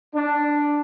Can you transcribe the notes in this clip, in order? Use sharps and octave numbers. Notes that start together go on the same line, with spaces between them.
D4